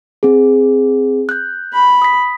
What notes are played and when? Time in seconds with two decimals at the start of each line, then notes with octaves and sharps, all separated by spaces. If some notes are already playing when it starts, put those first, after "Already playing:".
0.23 C4 G#4
1.29 F#6 G6
1.73 B5
2.02 D#6 B6